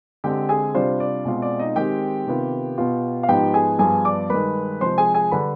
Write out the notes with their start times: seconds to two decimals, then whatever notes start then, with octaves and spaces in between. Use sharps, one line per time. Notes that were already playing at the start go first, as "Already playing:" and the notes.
0.24 D3 G#3 C4 G4 G5
0.49 G#4 G#5
0.75 C3 G3 D4 F4 C5
1.00 D5
1.25 B2 G#3 C4 F4
1.42 D5
1.59 D#4 D#5
1.76 D#3 G#3 C4 D#4 G4 G5
2.27 C3 D#3 B3 F4
2.78 B2 B3 F4
3.23 F5
3.29 G#2 F3 B3 D#4 G4 G5
3.54 G#4 G#5
3.79 G2 F3 B3 G#4 G#5
4.05 D5 D6
4.30 G2 D#3 G#3 B4 B5
4.81 C3 F3 G#3 C5 C6
4.98 G#4 G#5
5.14 G#4 G#5
5.31 D3 G3 D4 B4 B5